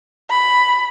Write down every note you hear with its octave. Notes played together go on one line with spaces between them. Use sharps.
B5